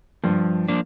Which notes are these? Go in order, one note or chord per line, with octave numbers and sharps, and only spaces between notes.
G2 F3
F3 A#3 D4